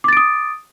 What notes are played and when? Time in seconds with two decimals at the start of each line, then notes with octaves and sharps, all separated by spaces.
0.04 D6
0.08 A6
0.13 D7
0.17 D#6